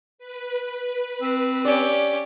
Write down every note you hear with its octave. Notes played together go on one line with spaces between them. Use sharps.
B4
C4
C#4 G4 D5